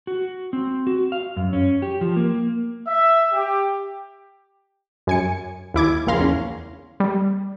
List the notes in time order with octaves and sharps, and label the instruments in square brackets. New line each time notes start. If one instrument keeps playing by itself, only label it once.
[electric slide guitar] F#4
C4
F#4
F5
F#2
C#4
G4
F3
A#3
[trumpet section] E5
G4
[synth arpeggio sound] F#2 G#5 C#7
D#2 E4 D6 G#6
A#1 A#2 C#3 F5 C6 A#6
E2 C#4
G3